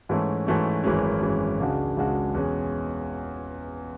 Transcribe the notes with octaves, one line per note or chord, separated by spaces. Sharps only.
G#2 E3 A3 C#4
G#2 E3 A3 C#4
G#1 F#2 E3 G#3 C#4
G#1 F#2 E3 G#3 C#4
C#2 C#3 G#3 D4 F#4
C#2 C#3 G#3 D4 F#4
E2 B2 G#3 C#4